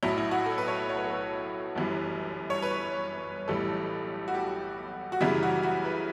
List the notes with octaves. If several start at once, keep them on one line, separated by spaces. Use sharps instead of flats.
B1 A2 F#3 E4
E4
F#4
A4
B4
C#5
C#5
B4
A4
B4
G1 F#2 E3 G3
C#5
B4
B1 A2 E3 G3 A4
F#4
G4
F#4
F#2 C#3 E3 G3 E4
F#4
F#4
B4